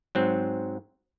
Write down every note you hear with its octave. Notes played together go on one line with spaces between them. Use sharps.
G#2 F#3 C4